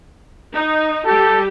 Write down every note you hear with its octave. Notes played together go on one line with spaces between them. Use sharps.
D#4
G3 G4 A4